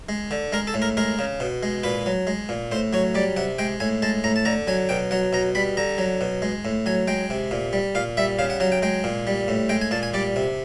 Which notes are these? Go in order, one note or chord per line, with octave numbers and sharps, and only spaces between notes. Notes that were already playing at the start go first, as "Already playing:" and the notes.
G#3
D3
G#3 A#4
A4
A2
A#4
G#3 A#4
C#3
B2
G#3
A#2 B4
F#3
G#3
A#2
A2 C5
F#3 C#5
G3 D5
C3 F#5
G#3 G5
A2 G#5
G#3 A5
A2 A#5
A5
D3 A#5
F#3 G#5
B2 G5
F#3 F#5
B2 A#5
G3 B5
D3 A#5
F#3
B2
G#3
A2
F#3 G#5
G#3 G5
C3
A#2
G3
A#2 F5
G3 E5
C#3 F5
F#5
F#3 F#5
G5
G#3 G5
A#2
G3
A2
G#3 G5
G#5
A#2 A5
G#5
G3 D5
C3